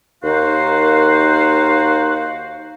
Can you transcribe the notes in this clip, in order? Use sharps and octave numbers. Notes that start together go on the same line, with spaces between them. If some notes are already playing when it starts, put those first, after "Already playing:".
D#2 D#3 D#4 F#4 C5 F5